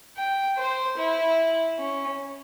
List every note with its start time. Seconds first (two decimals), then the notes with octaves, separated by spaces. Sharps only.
0.17 G5
0.58 C5
0.98 E4
1.79 C#4